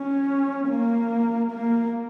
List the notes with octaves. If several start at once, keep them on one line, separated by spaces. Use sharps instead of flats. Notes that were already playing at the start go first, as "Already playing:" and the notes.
Already playing: C#4
A#3
A#3